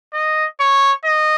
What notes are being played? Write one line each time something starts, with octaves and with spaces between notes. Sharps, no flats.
D#5
C#5
D#5